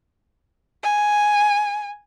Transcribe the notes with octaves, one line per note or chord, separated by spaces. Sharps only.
G#5